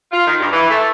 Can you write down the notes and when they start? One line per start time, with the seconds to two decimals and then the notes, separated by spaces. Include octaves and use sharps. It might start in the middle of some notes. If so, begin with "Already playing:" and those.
0.12 F4
0.26 D#3
0.39 G2
0.52 E3
0.71 A3